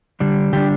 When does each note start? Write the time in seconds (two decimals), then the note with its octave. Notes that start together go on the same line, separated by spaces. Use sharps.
0.20 D3 G3 D4
0.53 D3 G3 D4 G4